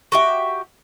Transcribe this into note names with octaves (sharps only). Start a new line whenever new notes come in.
F#4 G4 E5